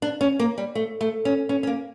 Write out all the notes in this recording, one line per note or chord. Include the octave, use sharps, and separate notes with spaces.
D4
C#4
A#3
G3
A3
A3
C#4
C#4
C#4
A#3